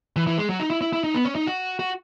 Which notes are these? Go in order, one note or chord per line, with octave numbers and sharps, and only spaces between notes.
E3
E3
G#3
F#3
D#4
E4
E4
E4
D#4
B3
C#4
D#4
F#4
F#4